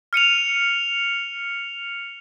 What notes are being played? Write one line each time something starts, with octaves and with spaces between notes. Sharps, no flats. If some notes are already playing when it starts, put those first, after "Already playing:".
F6 C#7 D#7 F7